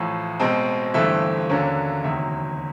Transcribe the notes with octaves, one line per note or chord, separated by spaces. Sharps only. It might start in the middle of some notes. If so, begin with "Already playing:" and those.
Already playing: A1 A2 F3
B1 B2 G#3 C4 D#5
G1 G2 E3 A3 C4 E5
D#2 D3 F#3 A#3 C#4
E1 D2 C3 D#3 F#3 E5